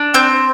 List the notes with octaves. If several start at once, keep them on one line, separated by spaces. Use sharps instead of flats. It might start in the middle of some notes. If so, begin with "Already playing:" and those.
Already playing: D4
C4 G6